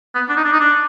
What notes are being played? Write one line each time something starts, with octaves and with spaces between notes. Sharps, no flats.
B3
D4
D#4
D4
D#4
D4